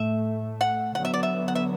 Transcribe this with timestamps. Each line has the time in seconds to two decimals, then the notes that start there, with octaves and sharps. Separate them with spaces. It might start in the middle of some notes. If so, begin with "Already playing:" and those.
Already playing: A2 A3 E5
0.61 F#5
0.95 D3 F#3 B3 F#5
1.05 E5
1.14 D5
1.23 E5
1.48 F#5
1.55 E5